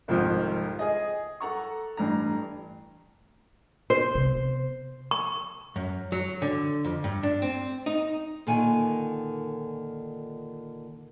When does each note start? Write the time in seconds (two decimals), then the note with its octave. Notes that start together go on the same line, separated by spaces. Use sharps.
0.08 C2 F2 G#2 C3 D#3 F3
0.79 G#4 D#5
1.40 A4 F#5 A#5 C#6
1.97 A1 G2 A#5
3.90 C5
4.15 C3 B3
5.11 C#6
5.76 F#2
6.12 F#3
6.42 D3
6.85 F2
7.04 G2
7.23 D4
7.42 C4
7.86 D#4
8.47 A#2 D3 D#3 G#5